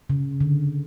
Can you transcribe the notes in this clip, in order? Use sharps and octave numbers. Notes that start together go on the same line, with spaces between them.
C#3
D3